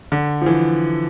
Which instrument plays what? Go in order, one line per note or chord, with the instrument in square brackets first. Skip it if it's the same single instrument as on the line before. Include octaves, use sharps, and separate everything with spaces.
[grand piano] D3
F3
E3